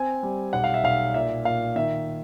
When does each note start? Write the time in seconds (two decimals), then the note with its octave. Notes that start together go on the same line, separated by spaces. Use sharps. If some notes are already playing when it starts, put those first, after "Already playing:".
Already playing: C4 G#5
0.23 G3
0.53 B1 F#5
0.64 F5
0.74 E5
0.83 B1 F5
1.14 A#2 E5
1.45 A#2 F5
1.76 D#3 E5